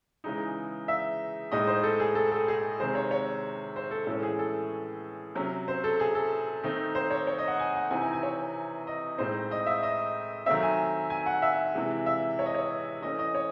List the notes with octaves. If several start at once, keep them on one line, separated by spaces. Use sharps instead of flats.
C#3 E3 G#3 D#4
E5
A2 G#3 D#4 D#5
C5
A4
G#4
A4
A4
G#4
C3 D#3 G#3 C5
C#5
C#5
C5
A4
A2 E3 G#3 C#4 A4
G#4
A4
C3 F#3 C#4
C5
A4
G#4
A4
D#3 A3 C4 D#4
C5
C#5
C#5
D#5
F#5
G#5
F#5
C3 E3 C4 D#4 G#5
G#5
G#5
C#5
D#5
A2 G#3 C4 D#4 C5
D#5
E5
D#5
D#3 F#3 A3 C4 E5
G#5
G#5
F#5
E5
C3 E3 G#3
E5
C#5
D#5
C#5
E3 A3 C#4 D#5
D#5
C#5